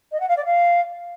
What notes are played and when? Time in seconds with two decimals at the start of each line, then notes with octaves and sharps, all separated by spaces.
0.12 D#5
0.20 F#5
0.29 F5
0.37 D5
0.45 F5